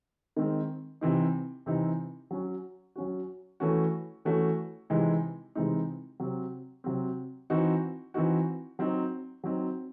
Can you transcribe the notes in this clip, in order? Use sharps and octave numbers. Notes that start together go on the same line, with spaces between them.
D#3 G#3 C4
C3 E3 C4 D#4
C3 E3 C4 D#4
F#3 C#4 F#4
F#3 C#4 F#4
E3 A3 C#4 F#4
E3 A3 C#4 F#4
C3 E3 G#3 C4 D#4
C3 E3 G#3 C4 D#4
C3 F#3 C4
C3 F#3 C4
E3 C4 D#4 F#4
E3 C4 D#4 F#4
F#3 C4 D#4
F#3 C4 D#4